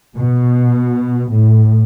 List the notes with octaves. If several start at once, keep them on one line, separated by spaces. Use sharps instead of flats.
B2
A2